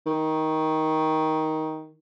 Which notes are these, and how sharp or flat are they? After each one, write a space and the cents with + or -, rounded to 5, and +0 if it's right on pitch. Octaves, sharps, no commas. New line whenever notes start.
D#3 +15